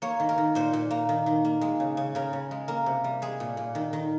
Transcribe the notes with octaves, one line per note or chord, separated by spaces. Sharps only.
A#3 C#5
D#3
A#4
D#3
A#2 C5
A#2
A#3
D#3
D#3
A#3
G#3
C#3
C#3
C#3 A#4
C#3
G#3
A#3 A#4
C3
G3
G#3 G#4
A#2
A#2
D#3
D#3